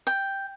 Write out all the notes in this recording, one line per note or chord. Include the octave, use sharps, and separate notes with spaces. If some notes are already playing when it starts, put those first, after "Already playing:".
G5